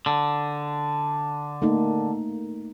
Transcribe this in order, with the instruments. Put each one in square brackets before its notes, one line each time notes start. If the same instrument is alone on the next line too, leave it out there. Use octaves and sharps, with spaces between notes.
[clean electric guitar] D3
[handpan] A3 A#3 D#4